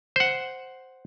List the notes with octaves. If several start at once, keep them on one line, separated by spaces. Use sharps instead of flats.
C5 F#5